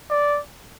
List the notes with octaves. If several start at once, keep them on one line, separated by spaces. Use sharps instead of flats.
D5